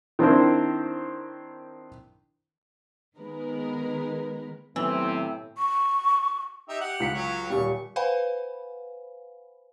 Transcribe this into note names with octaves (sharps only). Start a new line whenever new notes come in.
D#3 C4 D4 E4 A#4 C5
D#3 G#3 B3 A#4 B4
A2 C3 D#3 E3 F#3 B3 C4
C#6
D#4 G4 E5
G4 F#5
C#2 B6 C#7
F#3 C#5
D#1 G3 C#6
B4 C5 F5 F#5 G#5 B5